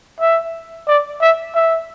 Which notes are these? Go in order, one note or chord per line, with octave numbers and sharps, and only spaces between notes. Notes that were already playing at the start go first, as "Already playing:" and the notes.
E5
D5
E5
E5